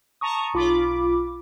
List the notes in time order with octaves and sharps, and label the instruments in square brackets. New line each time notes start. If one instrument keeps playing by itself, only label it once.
[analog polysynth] A5 A#5 C#6 D#6
B1 F4 B5 D6